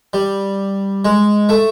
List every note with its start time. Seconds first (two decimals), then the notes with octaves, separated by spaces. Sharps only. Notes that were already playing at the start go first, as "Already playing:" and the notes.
0.13 G3
1.05 G#3
1.49 A3